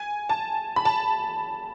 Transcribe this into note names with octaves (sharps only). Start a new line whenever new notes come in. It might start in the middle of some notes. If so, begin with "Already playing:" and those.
Already playing: G#5
A5
B5
A5